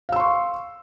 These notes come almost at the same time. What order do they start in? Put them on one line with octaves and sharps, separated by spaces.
F5 E6 C6 C#6